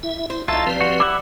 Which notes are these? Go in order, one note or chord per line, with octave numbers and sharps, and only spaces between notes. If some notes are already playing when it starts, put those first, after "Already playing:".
E4 E5
E4 C5
C2 F#3 D#4 F4 A4 E5 A5
F3 G3 C4 G4 B4
F#4
E4 E5 F#5 D6